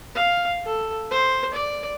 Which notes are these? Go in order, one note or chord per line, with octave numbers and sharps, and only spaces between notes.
F5
A4
C5
D5